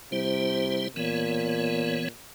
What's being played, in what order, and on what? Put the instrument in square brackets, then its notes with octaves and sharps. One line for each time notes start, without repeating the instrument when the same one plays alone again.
[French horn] C3 [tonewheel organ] G3 E4 C5
[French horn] A#2 [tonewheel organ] E3 B3 C#5